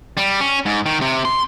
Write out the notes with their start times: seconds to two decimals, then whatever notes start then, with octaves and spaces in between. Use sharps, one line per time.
0.17 G3
0.41 C#4
0.66 G#2
0.86 D#3
1.01 C3
1.25 C6